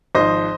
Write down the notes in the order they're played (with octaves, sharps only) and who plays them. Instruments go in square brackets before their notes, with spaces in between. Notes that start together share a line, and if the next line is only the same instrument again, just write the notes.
[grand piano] G#1 G#2 F3 C5 D#5